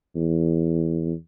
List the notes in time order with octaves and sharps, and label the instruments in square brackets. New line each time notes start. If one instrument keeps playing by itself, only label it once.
[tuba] E2